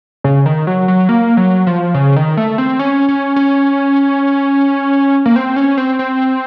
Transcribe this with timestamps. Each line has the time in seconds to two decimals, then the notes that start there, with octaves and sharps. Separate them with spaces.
0.24 C#3
0.46 D#3
0.67 F#3
0.88 F#3
1.09 A#3
1.37 F#3
1.67 F3
1.94 C#3
2.16 D#3
2.37 A3
2.58 C4
2.79 C#4
3.08 C#4
3.36 C#4
5.26 A#3
5.36 C4
5.56 C#4
5.78 C4
5.99 C4